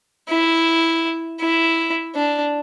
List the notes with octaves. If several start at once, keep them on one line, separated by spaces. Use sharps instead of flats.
E4
E4
D4